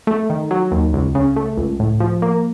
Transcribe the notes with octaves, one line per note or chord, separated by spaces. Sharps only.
A3
D#3
F#3
D#2
C#2
C#3
A3
C#2
A2
F3
A#3